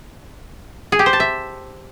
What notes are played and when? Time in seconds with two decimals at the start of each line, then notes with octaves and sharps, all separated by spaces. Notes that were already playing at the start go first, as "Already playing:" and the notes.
0.92 G#4
0.99 G4
1.06 C5
1.13 A5
1.20 E5